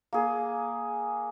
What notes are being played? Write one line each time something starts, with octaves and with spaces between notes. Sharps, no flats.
A#3 G#4